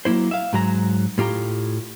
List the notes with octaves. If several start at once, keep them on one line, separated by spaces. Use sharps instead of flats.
F#3 A#3 E4 C5
E5 F5
G#2 F#3 A#5
A2 F4 G4 A#5